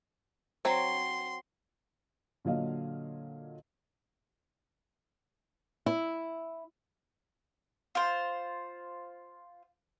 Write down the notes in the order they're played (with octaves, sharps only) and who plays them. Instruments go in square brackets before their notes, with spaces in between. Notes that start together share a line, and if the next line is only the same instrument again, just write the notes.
[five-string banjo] F#3 C4 C#5 [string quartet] C6
[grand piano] A#2 D3 F#3 D#5 F5
[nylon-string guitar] E4
[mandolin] F4 C5